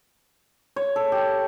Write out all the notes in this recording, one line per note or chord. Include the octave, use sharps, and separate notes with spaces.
C#5
A4
G4